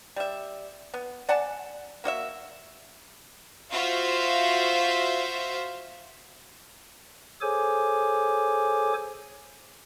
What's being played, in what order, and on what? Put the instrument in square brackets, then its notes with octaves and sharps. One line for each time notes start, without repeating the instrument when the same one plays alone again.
[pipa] G3 E5
B3
D5 F#5 G#5 A5
A#3 F#4 D#5 E5
[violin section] F4 F#4 C5 E5 F5
[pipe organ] G#4 A4 C5 C#5 G#5 D6